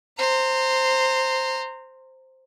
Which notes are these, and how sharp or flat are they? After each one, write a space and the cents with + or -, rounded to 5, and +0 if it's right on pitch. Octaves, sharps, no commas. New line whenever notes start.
C5 +0 A#5 -25